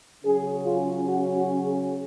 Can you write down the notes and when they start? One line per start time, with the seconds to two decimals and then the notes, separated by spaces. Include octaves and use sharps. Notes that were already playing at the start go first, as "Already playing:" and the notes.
0.23 C#3 F#3 C#4 G#4
0.66 F4
1.08 F#4
1.36 F#4
1.64 G#4